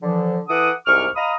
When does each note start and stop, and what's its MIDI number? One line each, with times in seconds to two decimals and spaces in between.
0.01 0.39 50
0.01 0.39 52
0.01 0.39 53
0.48 0.71 52
0.48 0.71 69
0.48 0.71 78
0.48 0.71 86
0.48 0.71 87
0.86 1.06 36
0.86 1.06 44
0.86 1.06 85
0.86 1.06 86
0.86 1.06 89
1.16 1.34 75
1.16 1.34 77
1.16 1.34 82
1.16 1.34 83
1.16 1.34 87